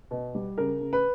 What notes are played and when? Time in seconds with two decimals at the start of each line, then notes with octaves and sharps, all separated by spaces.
0.11 B2
0.35 G3
0.58 C#3 A#4
0.81 C#3
0.93 B4